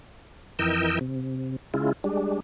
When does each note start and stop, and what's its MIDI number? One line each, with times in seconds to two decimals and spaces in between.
0.59 0.99 41
0.59 0.99 52
0.59 0.99 70
0.59 0.99 75
0.59 0.99 79
0.59 0.99 88
1.01 1.56 48
1.74 1.93 49
1.74 1.93 56
1.74 1.93 64
1.74 1.93 65
2.04 2.40 55
2.04 2.40 56
2.04 2.40 62